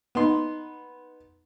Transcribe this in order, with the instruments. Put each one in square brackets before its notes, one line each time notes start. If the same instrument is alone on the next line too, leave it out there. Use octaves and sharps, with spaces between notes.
[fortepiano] B3 D#4 C6